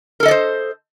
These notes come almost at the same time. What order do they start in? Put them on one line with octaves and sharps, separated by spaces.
A#4 A4 D#5 D5 C5